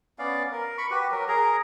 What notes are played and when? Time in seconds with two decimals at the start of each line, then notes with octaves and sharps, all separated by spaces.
0.19 B3 C#4 D5 F5
0.52 A#4
0.78 B5 C#6
0.91 F#4 G4 B4
1.11 F#3 A#4
1.28 G#4 A#4 A#5